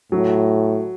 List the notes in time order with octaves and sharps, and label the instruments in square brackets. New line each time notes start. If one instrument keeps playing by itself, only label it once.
[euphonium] A2 [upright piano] F#3